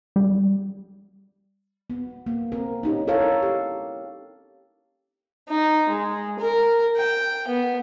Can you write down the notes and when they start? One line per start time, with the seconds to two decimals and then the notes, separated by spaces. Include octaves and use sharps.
0.16 G3
1.90 B3
2.26 A#3
2.52 C4 A#4
2.83 C#4 D#4 G4
3.07 E4 A4 A#4 C#5 F5
3.42 G4
5.49 D#4
5.89 G#3
6.39 A#4
6.97 G5
7.48 B3